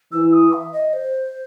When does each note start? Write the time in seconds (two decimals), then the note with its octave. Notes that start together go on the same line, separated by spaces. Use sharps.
0.12 E3 E6
0.33 D#6
0.53 E5
0.73 D#5
0.93 C5